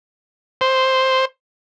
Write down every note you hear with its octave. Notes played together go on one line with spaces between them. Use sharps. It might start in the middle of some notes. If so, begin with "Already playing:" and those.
C5